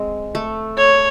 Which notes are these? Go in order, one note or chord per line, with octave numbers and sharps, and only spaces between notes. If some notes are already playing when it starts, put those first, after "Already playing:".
Already playing: G#3 C4
A3
C#5